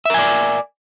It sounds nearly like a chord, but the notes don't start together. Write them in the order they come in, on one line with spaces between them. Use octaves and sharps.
E5 A#4 G#5 D5